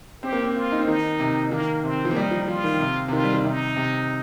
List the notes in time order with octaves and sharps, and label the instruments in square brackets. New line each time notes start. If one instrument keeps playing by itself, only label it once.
[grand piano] C4 [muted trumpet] G4
[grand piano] A#3
C4
[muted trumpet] F4
[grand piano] D#4
C4
[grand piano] D#3 [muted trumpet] D#4
[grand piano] C3
[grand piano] D#3 [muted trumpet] A#3
[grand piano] C3 [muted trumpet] C4
[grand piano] F3
A#3
[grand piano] G3 [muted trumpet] D#4
[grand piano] F3
[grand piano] F3 [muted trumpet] F4
[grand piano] D#3
C3
C3
[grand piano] D#3 [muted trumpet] F4
[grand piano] G3
D#3
[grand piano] C3 [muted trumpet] D#4
[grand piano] C3